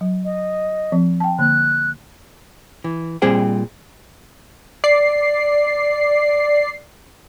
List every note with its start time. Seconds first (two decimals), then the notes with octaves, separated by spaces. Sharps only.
0.01 F#3
0.24 D#5
0.92 F3 C4
1.20 G5 A5
1.39 D3 A#3 F#6
2.84 E3
3.22 A#2 G3 C4 G#4 C5 G5
4.84 D5 C7